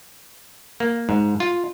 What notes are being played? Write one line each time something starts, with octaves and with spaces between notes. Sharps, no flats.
A#3
G#2
F4